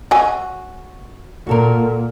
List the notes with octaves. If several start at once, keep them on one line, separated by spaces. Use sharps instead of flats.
F#3 F#4 D#5 G#5
A#2 F#4 A4 A#4